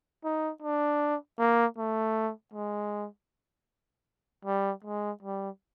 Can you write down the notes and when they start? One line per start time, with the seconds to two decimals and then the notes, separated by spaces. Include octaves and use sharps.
0.24 D#4
0.62 D4
1.39 A#3
1.78 A3
2.54 G#3
4.45 G3
4.84 G#3
5.23 G3